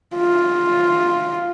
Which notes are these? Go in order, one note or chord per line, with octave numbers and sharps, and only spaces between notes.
F4